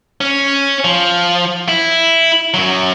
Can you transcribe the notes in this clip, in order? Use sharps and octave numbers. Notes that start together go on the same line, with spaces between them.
C#4
F3
E4
F#2 F#3